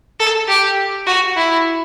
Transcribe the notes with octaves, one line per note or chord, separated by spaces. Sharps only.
A4
G4
F#4
E4